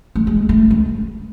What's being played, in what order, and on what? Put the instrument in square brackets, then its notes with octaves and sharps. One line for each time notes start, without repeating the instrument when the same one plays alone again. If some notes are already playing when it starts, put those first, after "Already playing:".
[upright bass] A3
G#3
A3
G#3